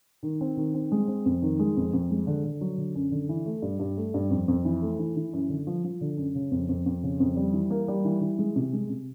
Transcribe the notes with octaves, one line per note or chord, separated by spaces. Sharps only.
D#3
C4
D#3
C4
G#3
C4
F2
D#3
G#3
F2
F2
G#3
D3
D3
F#3
D3
F#2
D3
E3
A3
G2
G2
A3
G2
F2
F2
E3
A3
E3
E3
F#2
D3
F3
F3
D3
F#2
C#3
F2
F2
F2
C#3
F2
G3
E3
A#3
G3
E3
E3
G#3
C3
G#3
C3